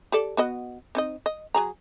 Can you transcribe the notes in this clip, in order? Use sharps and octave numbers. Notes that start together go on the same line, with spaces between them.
G4 A4 D5
B3 F#4 D#5
C4 D#4 D#5
D#5
F#3 G#4 A#5